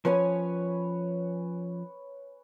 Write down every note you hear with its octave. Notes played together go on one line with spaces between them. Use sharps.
F3 C#4 B4 C#5 G#5